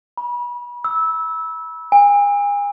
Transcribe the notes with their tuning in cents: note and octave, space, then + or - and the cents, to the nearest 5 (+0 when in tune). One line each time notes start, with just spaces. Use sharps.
B5 -30
E6 -15
G#5 -35